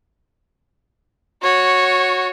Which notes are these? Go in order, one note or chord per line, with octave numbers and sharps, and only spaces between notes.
F#4 C#5